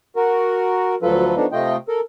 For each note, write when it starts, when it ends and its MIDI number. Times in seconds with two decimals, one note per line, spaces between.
0.16 0.95 66
0.16 0.95 70
1.02 1.35 38
1.02 1.35 53
1.02 1.35 54
1.02 1.35 65
1.02 1.35 69
1.02 1.35 71
1.36 1.46 53
1.36 1.46 57
1.36 1.46 59
1.36 1.46 62
1.36 1.46 63
1.52 1.76 48
1.52 1.76 57
1.52 1.76 65
1.52 1.76 75
1.52 1.76 79
1.88 2.01 69
1.88 2.01 70